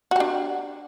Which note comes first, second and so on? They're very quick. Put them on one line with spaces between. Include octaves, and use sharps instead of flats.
F#4 G4 D4